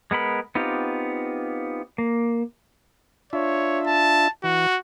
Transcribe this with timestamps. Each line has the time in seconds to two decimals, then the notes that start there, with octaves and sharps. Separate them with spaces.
0.11 G#3 B3 A#4 B5
0.55 B3 C4 D#4 F4 G4
1.98 A#3
3.33 D4 F4 C#5 E5
3.87 A5
4.44 E3 F#4